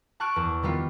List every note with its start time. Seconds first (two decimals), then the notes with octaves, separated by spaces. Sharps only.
0.20 A5 C#6 F6 F#6 D7
0.36 E2
0.63 D#3 G3 B3 F4